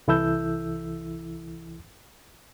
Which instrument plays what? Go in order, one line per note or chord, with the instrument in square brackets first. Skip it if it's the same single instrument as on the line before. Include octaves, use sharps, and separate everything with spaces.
[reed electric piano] C2 E3 E4 A4 E6 G6